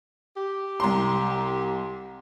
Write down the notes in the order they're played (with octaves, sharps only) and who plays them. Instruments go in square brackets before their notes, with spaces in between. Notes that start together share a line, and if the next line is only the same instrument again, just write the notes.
[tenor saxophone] G4
[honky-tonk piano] C2 A#5 C6